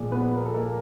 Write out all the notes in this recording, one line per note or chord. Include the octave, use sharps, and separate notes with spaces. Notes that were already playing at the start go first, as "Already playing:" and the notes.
Already playing: A#2 F3 G#3
B3 B4
A#4
A4
A#3 A#4